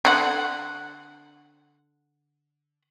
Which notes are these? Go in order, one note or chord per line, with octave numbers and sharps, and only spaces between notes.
D3 D#4 F#5